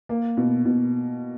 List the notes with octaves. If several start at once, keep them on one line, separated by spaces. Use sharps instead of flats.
A#3
B2
B2